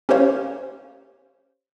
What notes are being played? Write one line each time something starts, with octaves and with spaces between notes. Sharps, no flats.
C#4 G4 A#4 C5 C#5 F5